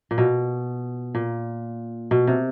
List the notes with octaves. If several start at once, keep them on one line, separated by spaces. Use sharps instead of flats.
A#2
B2
A#2
B2
C3